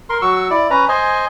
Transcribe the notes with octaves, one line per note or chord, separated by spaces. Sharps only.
A#4 C6
F#3 F#4 C#6 E6
E4 D5
C#4 B4 A#5
C5 D#5 G#5